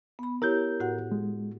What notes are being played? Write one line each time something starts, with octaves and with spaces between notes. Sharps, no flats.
B3 B5
E4 G4 A#4 C#5 G6
A2 F#4 F#5
G#3